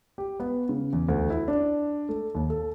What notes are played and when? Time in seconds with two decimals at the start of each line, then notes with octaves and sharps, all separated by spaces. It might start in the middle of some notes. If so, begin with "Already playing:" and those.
0.18 G4
0.40 B3
0.69 C#3
0.93 E2
1.08 D2
1.30 E4
1.48 D4
2.09 A3
2.35 D#2
2.50 A4